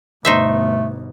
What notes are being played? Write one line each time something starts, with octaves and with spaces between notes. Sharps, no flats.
G1 B2 A3 D#4 C5 E5